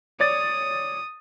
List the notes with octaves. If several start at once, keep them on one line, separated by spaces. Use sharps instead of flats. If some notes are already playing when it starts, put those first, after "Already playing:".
C#5 D5 D#6 A6